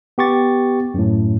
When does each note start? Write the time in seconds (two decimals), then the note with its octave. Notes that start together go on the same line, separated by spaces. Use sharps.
0.18 B3 G4 C#6 A6
0.94 F#2 A2